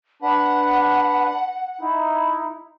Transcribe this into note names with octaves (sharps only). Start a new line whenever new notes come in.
D4 B4 F#5
D#4 E4